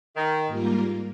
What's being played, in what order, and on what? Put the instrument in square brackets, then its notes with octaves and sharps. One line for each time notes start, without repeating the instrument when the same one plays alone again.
[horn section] D#3
[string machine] G#2 G3 A#3 F4 A#4